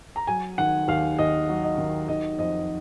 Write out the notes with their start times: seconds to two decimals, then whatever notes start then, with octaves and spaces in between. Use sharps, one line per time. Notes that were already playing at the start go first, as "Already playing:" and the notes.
0.16 A#5
0.27 F#3 G#5
0.58 D#3 F#5
0.88 D#2 F5
1.19 D#2 D#5
1.49 F#3
1.64 D#5
1.78 D#3
2.08 D#3 D#5
2.38 F2 D#5